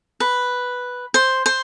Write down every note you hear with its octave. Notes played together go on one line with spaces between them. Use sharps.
B4
C5
C5